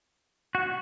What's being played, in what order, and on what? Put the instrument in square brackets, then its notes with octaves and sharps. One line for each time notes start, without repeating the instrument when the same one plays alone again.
[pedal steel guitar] F#4